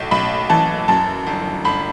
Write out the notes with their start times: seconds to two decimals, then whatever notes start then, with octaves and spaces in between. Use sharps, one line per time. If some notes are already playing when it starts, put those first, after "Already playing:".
Already playing: B1 A2
0.11 B1 B5
0.50 E3 A5
0.88 F#2 A5
1.27 G1
1.65 G1 B5